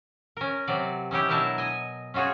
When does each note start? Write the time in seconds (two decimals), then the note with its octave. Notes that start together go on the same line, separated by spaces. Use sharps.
0.37 C#4 A#4
0.67 C3 F#3 D5
1.11 C#4 D#4 E4 G4
1.29 B2 F#3 D4 E4 A#4 A5
1.58 D#5 G#5
2.14 C#4 F4 F#4 G#4 C#5